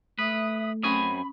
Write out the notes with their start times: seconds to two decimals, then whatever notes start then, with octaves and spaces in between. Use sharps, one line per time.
0.19 A3 B4 E5 D#6
0.83 F#2 C4 C#4 G#5 B5 C#6 D#6